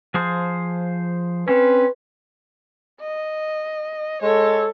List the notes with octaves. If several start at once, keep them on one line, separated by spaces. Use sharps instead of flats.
F3 G#4 C5
C4 C#4 B4
D#5
G#3 A4 C#5